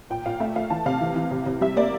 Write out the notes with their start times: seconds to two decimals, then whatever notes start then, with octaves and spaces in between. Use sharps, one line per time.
0.10 A#2 G5
0.26 A#2 F5
0.40 A3 E5
0.56 A3 F5
0.70 E3 A5
0.86 C3 F5
1.01 E3
1.16 E3
1.31 C3
1.46 C3
1.61 G3 E5
1.77 A#3 D5